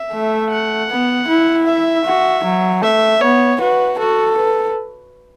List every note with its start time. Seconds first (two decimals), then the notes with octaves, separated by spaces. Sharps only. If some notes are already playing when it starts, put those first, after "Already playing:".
Already playing: E5
0.13 A3
0.51 F#5
0.90 B3
1.28 E4
1.67 E5
2.05 F#4
2.44 F#3
2.82 A3 E5
3.21 B3 C#5
3.60 F#4 B4
3.99 F#4 A4
4.37 B4